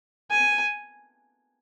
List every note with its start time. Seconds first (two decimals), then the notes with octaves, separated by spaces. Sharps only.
0.30 G#5